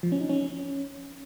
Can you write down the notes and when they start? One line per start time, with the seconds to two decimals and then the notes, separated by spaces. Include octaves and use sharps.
0.03 F3
0.12 C#4
0.21 D#4
0.29 C#4